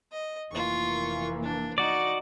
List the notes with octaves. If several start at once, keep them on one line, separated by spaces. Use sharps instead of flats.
D#5
F1 E3 A#3 F4 C#6
D4
D#4 F#4 D5 D#5